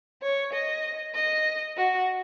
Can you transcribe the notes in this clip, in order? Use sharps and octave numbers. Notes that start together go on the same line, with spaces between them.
C#5
D#5
D#5
F#4